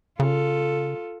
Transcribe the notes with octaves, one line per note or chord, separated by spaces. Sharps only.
C#3 F4 A4